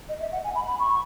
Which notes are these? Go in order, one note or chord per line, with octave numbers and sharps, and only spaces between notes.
D#5
E5
F#5
G#5
B5
B5
C#6